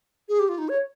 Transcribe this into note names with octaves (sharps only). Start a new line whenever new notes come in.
G#4
G4
F4
D#4
C#5